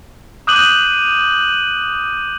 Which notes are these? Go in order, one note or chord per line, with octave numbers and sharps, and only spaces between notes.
D6 D#6 F#6 G6 D#7 F#7